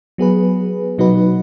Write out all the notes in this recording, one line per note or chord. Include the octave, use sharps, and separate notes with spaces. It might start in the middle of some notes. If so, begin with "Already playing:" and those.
F#3 B3 G#4 B4
B2 F#3 D#4 F#4 B4